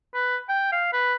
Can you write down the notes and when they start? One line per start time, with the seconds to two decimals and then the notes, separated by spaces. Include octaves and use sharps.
0.14 B4
0.49 G5
0.72 F5
0.93 B4